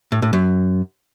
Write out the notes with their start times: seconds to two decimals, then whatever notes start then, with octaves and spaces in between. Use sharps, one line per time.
0.12 A2
0.22 A2
0.33 F#2